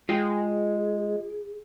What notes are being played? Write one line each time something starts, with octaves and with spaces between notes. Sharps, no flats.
G#3 F4 G#4 D#5 G5